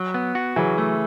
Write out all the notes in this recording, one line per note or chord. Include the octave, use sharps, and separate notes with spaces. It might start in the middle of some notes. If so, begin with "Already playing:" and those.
Already playing: F#3
B3
F#4
C#3 E3 F#3
A3